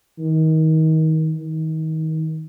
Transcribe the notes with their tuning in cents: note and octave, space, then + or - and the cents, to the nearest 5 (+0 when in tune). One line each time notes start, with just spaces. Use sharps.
D#3 +25
D#3 +30